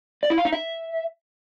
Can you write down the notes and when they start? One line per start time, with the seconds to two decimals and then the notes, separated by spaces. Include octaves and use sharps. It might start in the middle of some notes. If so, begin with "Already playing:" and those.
0.23 D5
0.30 E4
0.38 F5
0.45 D#4
0.52 E5